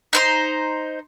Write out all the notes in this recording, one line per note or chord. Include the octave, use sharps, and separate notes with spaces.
D#4 C5 C6